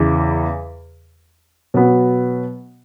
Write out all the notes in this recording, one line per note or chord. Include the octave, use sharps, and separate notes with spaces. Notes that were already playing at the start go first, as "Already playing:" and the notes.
Already playing: E2 C#3 E3
B2 F#3 B3